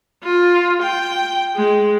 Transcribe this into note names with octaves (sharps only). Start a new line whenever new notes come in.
F4
G5
G#3